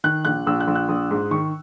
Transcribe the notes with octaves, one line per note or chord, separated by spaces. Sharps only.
D#3 F#6
A#1 F#6
A#1 E6
F#6
A#1
F#6
A#1 D#6
G#2
D#3 C#6